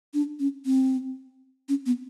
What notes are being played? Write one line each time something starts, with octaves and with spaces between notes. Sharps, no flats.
D4
C#4
C4
C#4
B3